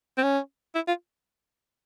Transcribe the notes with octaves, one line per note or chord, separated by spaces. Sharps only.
C4
C#4
E4
F4